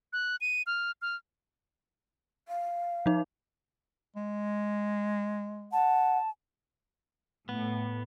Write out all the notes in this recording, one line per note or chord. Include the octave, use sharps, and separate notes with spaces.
F#6
D#7
F6
F6
F5
F3 D#4
G#3
F#5 A5
A2 B3